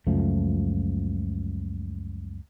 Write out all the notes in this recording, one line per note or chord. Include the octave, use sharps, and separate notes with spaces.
C#2 F#2 F3 A3